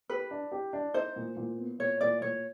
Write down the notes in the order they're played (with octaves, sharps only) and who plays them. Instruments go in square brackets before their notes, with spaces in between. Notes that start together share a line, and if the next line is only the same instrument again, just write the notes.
[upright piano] G4 [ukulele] B4
[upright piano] D4
G4
D4
[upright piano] D#4 [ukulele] C5
[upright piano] A#2
A#2
B3
[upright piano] A#2 [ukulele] C#5
[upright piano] A#2 [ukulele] D5
[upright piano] A#2 [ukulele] C#5